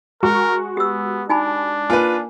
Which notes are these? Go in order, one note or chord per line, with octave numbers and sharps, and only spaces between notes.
G#3 F#4 A#4 C#6
B3 G4 E6
D4 D#4 G#5 B5
A#3 F4 B4 G#5